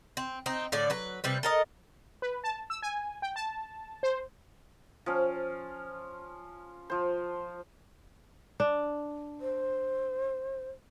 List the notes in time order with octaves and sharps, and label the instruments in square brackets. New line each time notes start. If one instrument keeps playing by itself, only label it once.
[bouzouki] C4
C4 D#4
A2 D3 D5
F#3 B4
C3 G3 B4
A4 A#4 D#5
[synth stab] B4
A5
E6
G#5
G5
A5
C5
[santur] F3 C#4
F3 C5
[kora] D4
[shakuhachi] C5